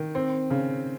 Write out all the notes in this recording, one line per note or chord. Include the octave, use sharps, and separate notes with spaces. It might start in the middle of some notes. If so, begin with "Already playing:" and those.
Already playing: D#3
C4
C#3